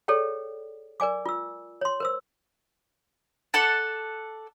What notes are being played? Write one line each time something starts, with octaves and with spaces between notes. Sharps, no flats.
G#4 A4 C#5 D5 G5
A#4 D5 G#5 D6
F4 E6
C#5 C6
A#4 C5 E6
A4 D5 F#5 A5